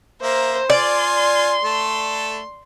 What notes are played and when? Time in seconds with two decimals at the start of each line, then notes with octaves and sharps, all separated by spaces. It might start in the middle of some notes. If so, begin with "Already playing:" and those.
0.22 A#3 C5 E5 A#5
0.70 F4 D5 G#5 C6
1.64 A3 A4